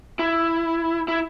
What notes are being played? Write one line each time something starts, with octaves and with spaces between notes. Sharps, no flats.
E4
E4